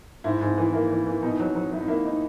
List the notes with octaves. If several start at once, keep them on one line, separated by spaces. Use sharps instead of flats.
G#2 E4
G#2
E3
A#3 E4
E3
E3
B2 D#4
F#3
F#3
F#3 E4
D#4
A#3 E4
D#4